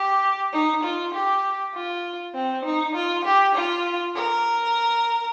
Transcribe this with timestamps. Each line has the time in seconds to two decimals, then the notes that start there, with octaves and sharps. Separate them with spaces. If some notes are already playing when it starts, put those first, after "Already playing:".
Already playing: G4
0.53 D#4
0.84 F4
1.14 G4
1.74 F4
2.34 C4
2.65 D#4
2.95 F4
3.25 G4
3.55 F4
4.16 A#4